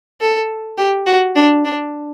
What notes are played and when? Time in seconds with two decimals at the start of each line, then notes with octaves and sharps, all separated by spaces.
0.21 A4
0.78 G4
1.07 F#4
1.36 D4
1.65 D4